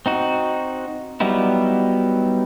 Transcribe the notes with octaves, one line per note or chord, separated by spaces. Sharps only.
C4 D#4 F#4
F#3 G3 B3 D#4 E4